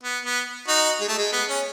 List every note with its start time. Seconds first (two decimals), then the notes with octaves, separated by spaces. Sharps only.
0.04 B3
0.25 B3
0.68 D#4 F#4
1.01 G#3
1.09 A3
1.18 G#3
1.33 B3
1.49 C#4